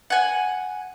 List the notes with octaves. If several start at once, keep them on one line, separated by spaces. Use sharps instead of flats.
F#5 G#5